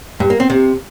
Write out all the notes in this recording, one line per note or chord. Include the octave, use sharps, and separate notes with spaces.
G2
A#3
C4
C3